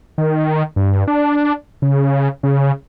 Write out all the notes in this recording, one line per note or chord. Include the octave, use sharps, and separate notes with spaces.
D#3
G2
D4
C#3
C#3